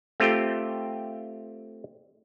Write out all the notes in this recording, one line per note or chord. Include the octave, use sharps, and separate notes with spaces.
A3 C4 F4 G4 G5